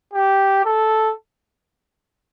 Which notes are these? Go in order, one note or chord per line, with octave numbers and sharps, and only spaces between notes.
G4
A4